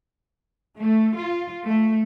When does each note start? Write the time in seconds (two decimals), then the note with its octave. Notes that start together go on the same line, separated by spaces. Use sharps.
0.79 A3
1.18 F4
1.66 A3